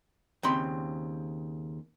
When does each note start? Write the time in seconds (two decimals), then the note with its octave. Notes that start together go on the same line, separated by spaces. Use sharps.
0.43 D#2 C#3 C4 B5 C6